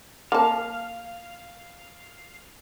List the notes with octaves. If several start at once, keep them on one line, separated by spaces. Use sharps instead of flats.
A#3 F5 A5